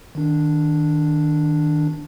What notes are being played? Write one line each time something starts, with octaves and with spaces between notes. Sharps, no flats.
D#3 D4